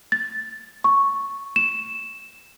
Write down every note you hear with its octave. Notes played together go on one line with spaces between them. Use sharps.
A6
C#6
E7